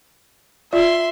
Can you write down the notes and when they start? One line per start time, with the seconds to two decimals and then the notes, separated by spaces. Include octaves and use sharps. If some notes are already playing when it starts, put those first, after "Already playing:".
0.73 F4 D5 E5 C6